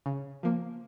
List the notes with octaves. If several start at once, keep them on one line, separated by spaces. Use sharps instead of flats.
C#3
F3 A#3